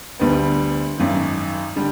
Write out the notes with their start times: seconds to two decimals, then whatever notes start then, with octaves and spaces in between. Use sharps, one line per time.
0.19 D2 D3 G3 B3
0.98 G#1 F#2 D#3
1.76 D3 G3